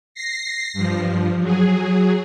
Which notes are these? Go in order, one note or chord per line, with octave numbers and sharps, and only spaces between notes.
A#6 C7
G2 F3
F#3 G#4